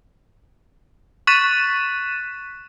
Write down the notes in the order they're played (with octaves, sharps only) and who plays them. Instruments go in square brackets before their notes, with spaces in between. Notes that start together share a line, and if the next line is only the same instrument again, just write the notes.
[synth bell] C#6 F#6 A6 B6 D#7 E7